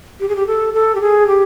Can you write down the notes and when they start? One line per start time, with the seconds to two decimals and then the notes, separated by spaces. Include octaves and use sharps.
0.20 G4
0.28 G#4
0.35 G4
0.46 A4
0.73 A4
0.95 G4
1.00 G#4
1.27 G4